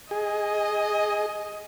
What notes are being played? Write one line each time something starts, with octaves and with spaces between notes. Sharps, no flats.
G#4 D#5